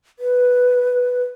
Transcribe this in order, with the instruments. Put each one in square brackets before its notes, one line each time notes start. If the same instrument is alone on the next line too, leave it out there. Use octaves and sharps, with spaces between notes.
[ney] B4